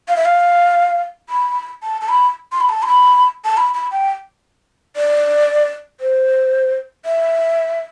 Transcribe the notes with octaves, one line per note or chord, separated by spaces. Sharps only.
F5
E5
F5
B5
A5
A5
B5
C6
B5
A5
C6
B5
A5
B5
B5
G5
D5
C5
E5